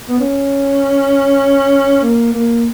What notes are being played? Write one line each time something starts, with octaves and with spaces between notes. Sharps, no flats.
B3
C#4
A#3
A#3